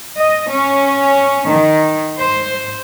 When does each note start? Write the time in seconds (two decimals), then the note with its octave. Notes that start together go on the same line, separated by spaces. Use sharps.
0.17 D#5
0.50 C#4
1.49 D#3
2.18 C5